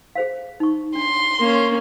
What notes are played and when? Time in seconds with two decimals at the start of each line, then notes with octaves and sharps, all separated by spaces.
0.15 G#4 C5 F5
0.60 D#4 C#6
0.95 D4 C6
1.39 A#3 C#4